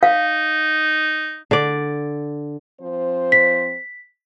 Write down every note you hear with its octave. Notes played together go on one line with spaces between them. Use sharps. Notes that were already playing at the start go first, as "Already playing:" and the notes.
D#4 F5
D3 D5
F3 C4 C5
B6